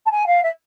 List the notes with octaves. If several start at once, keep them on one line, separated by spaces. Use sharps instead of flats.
A5
G#5
F5
E5